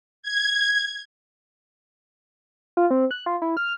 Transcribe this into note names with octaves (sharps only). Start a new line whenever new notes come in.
G#6
F4
C4
F#6
F4
E4
F6